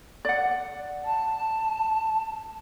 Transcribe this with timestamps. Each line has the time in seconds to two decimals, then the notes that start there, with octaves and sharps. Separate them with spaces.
0.25 D5 F#5
1.05 A5